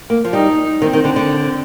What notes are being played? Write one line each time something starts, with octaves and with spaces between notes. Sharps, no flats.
A#3
F3
G3 D#4
D#3 C4
D#3
D3
D3